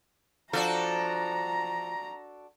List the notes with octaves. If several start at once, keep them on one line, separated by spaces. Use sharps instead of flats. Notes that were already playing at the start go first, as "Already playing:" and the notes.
F3 D4 F#4 A4 A#5